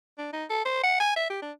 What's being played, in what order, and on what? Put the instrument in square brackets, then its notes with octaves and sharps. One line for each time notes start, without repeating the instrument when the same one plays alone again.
[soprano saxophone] D4
D#4
A4
C5
F#5
G#5
E5
G4
D4